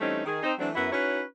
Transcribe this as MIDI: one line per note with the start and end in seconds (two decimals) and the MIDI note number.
0.01 0.24 52
0.01 0.24 55
0.01 0.24 57
0.01 0.24 60
0.01 0.24 61
0.01 0.24 63
0.25 0.40 51
0.25 0.40 68
0.43 0.53 60
0.43 0.53 63
0.43 0.53 72
0.59 0.70 52
0.59 0.70 54
0.59 0.70 57
0.59 0.70 60
0.59 0.70 62
0.75 0.90 42
0.75 0.90 59
0.75 0.90 64
0.75 0.90 66
0.75 0.90 71
0.75 0.90 76
0.92 1.22 61
0.92 1.22 63
0.92 1.22 64
0.92 1.22 66
0.92 1.22 71
0.92 1.22 73